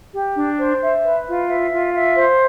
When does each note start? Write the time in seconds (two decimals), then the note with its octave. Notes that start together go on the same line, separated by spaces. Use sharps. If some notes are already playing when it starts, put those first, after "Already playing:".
0.13 G4
0.35 D4
0.57 C5
0.80 E5
1.03 B4
1.26 F4
1.48 E5
1.70 F4
1.93 E5
2.15 C5